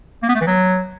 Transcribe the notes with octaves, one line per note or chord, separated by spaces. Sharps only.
A#3
B3
A3
E3
F#3